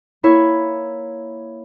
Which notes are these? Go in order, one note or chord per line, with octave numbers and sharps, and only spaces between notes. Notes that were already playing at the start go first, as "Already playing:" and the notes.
A#3 E4 C#5